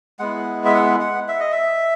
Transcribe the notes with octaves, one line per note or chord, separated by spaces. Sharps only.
G#3 B3 E4 F#5
E5
F#5
F#5
E5
D#5
E5